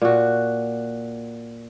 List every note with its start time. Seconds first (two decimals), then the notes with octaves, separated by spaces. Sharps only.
0.02 A#2 F#4